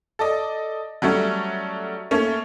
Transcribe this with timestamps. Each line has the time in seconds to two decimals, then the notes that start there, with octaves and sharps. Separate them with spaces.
0.19 A4 D5 D#5
1.02 F#3 G3 A3 C#4
2.11 A3 A#3 C#4